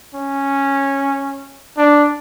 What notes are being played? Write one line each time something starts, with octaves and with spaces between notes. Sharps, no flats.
C#4
D4